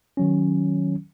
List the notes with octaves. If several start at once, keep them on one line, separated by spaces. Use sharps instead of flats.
D#3 F#3 C#4